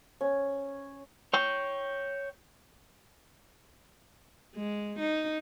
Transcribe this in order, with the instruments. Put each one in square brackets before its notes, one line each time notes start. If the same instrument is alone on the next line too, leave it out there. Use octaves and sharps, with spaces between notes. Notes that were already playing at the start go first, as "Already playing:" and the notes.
[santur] C#4
[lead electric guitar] C#5 G5
[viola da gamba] G#3
D#4